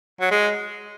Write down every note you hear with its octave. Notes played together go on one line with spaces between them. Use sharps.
F#3
G#3